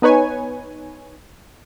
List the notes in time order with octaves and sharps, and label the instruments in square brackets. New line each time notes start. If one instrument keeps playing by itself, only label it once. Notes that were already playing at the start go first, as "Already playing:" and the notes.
[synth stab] B3 D#4 B4 C#5 G#5